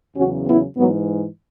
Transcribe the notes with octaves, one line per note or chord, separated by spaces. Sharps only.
E2 C#3 F#3 C#4 F#4
B3 E4
G#2 E3 F#3 B3